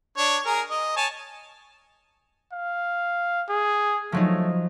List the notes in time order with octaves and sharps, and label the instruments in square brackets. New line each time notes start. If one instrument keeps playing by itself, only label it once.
[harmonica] D4 C#5
G#4 A#4
D#5
C#5 G#5 A5
[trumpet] F5
G#4
[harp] F3 F#3 D#4 [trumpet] A3